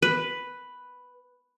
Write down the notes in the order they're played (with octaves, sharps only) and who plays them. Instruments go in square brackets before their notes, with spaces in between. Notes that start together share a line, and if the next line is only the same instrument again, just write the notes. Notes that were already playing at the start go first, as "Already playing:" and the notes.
[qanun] B4